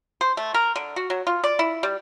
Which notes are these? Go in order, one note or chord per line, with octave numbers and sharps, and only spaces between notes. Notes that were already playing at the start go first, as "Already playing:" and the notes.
C5
A3
A#4
D3
F#4
F#3
F4
D5
E4
G3